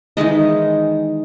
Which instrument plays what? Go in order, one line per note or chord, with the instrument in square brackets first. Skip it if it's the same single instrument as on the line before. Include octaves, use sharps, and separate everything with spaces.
[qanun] D#3 E3 G#3 D#5